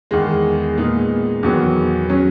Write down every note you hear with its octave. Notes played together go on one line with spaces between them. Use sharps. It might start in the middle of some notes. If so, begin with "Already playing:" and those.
E2 D#3 G#3
A#2 G#3 B3 D#4
E2 D#3 F#3 B3
F#3 C#4